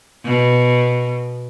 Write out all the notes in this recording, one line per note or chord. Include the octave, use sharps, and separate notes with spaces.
B2